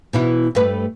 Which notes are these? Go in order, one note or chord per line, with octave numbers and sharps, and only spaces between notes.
B2 E3 E4
G2 A3 B4